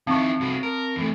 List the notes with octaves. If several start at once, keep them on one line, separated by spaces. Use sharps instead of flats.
D#3 C4 E4 A5 C#6
C2 F#4
A#4
E2 A3